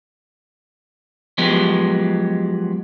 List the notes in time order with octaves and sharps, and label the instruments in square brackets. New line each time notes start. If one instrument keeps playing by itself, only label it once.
[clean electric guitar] F3 F#3 G#3 B3 G4